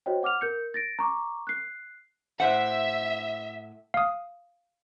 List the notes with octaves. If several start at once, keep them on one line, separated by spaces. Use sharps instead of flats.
F#4 C5 C#5 D#5 G5
F#5 D6 F6 F7
A#4 G6 C#7
A6 A#6 D7
A#5 C#6 D6
F#6 C7
A2 C5 E5 F#5
F5 D#6